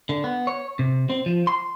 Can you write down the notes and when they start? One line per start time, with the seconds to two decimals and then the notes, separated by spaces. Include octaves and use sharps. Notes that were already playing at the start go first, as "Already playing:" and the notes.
0.09 D3
0.24 B3
0.47 C#5
0.79 C3
1.10 C4
1.26 F3
1.47 C6